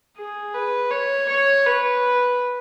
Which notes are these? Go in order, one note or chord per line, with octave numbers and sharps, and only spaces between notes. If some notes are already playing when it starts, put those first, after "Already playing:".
G#4
B4
C#5
C#5
B4